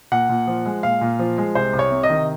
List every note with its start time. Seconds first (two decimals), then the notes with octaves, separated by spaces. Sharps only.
0.12 A#2 F#5
0.29 A#2
0.47 F3
0.66 G#3
0.83 A#2 F5
1.01 A#2
1.19 F3
1.38 G#3
1.55 C2 C5
1.73 C2
1.79 C#5
1.91 C3
2.03 D#5
2.10 D#3